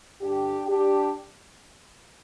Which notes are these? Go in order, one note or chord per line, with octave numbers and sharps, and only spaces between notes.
G2 D3 G3 D4 G4
D4 G4